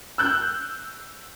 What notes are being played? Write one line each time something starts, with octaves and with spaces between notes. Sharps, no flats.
E6 F#6 G6